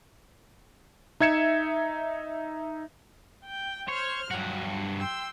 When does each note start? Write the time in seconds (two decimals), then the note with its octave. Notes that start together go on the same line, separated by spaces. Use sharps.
1.20 D#4 E5 G#6 C#7 E7
3.45 G5
3.88 C5 C#5 F6
4.31 G2 F#3 F#4
4.99 G5 C6 E6